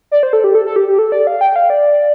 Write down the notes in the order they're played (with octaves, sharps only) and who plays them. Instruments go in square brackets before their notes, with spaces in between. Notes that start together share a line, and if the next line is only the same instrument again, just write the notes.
[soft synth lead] D5
C5
A4
G4
A4
A4
G4
G4
A4
D5
F5
G5
F5
D5